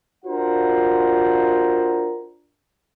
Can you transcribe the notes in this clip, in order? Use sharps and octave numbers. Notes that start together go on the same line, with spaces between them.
D4 F4 F#4 A#4 C5 F#5